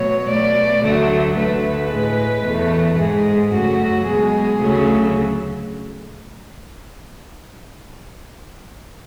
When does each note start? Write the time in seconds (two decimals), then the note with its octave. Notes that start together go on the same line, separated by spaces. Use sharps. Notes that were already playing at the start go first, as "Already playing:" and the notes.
Already playing: B2 F#3 A3 C#5
0.29 B2 A3 D5
0.84 D2 D3 F#3 A3
1.37 D2 D3 A3 B4
1.91 A2 G#3
2.45 E2 B2 A3
2.98 G#2 G#3 G#4
3.53 F#2 C#3 F#3 A3 F#4
4.06 B2 G#3 G#4
4.60 D2 C#3 F#3 A3